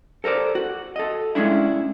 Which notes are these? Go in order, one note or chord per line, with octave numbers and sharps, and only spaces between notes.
A4 A#4 C5 D5
F#4
A4 D#5
G#3 C#4 D4 E4